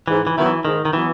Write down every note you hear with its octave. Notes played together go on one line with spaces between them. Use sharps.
G#2 E3
E3
D#3 F#3 B3 E4
E3
G#2 D#3
D#3
E3 F#3 B3 E4